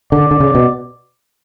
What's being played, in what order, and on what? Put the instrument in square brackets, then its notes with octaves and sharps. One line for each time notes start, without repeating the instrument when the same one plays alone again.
[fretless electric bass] D3 [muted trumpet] D5
[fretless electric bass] D3
C#3
B2